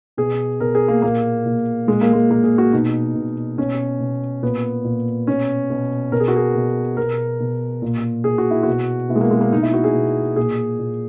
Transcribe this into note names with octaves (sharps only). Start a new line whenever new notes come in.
B2 G#4
B2 A#4
G#4
A#3
A#2 A#3
A#2
A#2 G#3
A#3
G#3
A#2 A#3
G#4
F#4
B2 D#4
B2
B2 C#4
B2
A#2 B3
A#2
B2 C#4
B2
B2 A#4
G#4
F#4
G#4
B2
B2 A#4
B2
A#2
A#2 G#4
F#4
E4
B2 F#4
B2 E4
G#3
A#3
G#3
A#3
B2 D#4
E4
F#4
G#4
B2
A#2 G#4
A#2